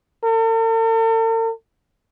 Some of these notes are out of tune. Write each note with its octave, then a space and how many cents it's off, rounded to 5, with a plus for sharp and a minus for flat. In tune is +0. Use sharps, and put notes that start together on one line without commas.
A4 +45